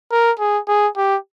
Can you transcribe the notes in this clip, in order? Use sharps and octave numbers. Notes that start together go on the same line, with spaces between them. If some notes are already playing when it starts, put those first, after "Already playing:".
A#4
G#4
G#4
G4